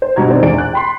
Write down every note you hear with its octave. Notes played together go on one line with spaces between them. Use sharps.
C5
G2 B2 A#5 G#6
D#3 C4 D5
A#1 E2 D4 A6 D7
F#6
G5 B5 C6